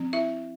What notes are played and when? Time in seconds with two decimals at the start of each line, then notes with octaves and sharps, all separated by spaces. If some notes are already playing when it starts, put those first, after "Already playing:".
Already playing: F3 C4
0.13 E4 E5